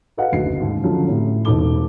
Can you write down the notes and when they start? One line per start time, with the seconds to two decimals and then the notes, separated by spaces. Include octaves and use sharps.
0.17 F#4 A4 B4 D#5 F5 F#5
0.32 F#1 D2 F#4 C7
0.60 D#2 G#2 C#3
0.83 D3 F3 F#3 C#4
1.07 A2 C3 C#4
1.45 E1 D#4 A4 D6 G7